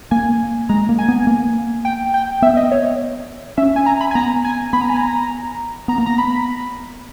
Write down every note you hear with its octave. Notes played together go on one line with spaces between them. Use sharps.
A#3 G#5
G#3 A#5
A#3
G#5
B3
A#3
G5
G5
B3 E5
D#5
C#5
C#4 E5
G#5
A#5
B5
G#5
B3 A#5
G#5
B3 B5
A#5
G#5
A#5
B3 A#5
A#3
B3 A#5
B5